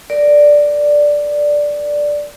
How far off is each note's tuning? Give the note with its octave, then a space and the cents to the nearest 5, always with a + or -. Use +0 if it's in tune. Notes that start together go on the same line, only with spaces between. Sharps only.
A#4 +0 D5 +0